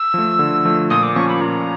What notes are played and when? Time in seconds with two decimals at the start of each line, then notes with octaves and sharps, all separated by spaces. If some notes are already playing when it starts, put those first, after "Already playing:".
Already playing: E6
0.14 F3 A3
0.39 D3
0.65 F3 A3
0.90 A#2 D#6
1.03 D6
1.16 F3 A#3 C#4 C#6
1.28 B5
1.41 A#2 A#5